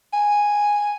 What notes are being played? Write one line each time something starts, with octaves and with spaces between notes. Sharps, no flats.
G#5